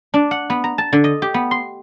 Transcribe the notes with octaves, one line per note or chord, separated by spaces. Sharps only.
D4
F#5
B3
A#5
A5
D3
D#5
G4
B3
C6